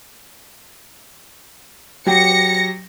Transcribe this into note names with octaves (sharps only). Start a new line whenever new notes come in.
F#3 G4 A#6 C#7